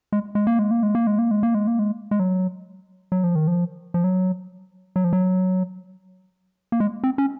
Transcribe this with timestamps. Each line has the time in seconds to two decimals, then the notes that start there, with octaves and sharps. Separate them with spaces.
0.12 G#3
0.35 G#3
0.47 A#3
0.59 G#3
0.71 A#3
0.83 G#3
0.95 A#3
1.07 G#3
1.19 A#3
1.31 G#3
1.43 A#3
1.55 G#3
1.67 A#3
1.79 G#3
2.11 G#3
2.20 F#3
3.12 F#3
3.24 F3
3.35 D#3
3.47 F3
3.94 F3
4.04 F#3
4.96 F#3
5.04 F3
5.13 F#3
6.72 A#3
6.80 G#3
7.03 C4
7.18 C#4